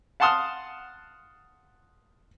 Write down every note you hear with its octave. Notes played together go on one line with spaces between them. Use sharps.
F5 F#5 A5 C6 D#6 F6